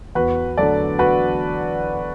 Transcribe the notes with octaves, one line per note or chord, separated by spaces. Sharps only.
E2 F#4 B4
D3 F#3 A3 A4 D5
F#4 B4